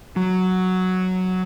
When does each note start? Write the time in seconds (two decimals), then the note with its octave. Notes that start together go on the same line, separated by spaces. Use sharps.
0.16 F#3